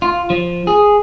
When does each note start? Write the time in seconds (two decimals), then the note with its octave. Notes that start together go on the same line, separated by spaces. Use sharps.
0.02 F4
0.30 F3
0.67 G#4